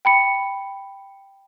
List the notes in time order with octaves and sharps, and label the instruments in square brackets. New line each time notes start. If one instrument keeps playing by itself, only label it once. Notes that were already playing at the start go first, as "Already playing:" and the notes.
[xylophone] G5 B5 C#7